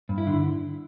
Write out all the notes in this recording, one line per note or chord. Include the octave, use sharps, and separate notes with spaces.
G2
E4
D3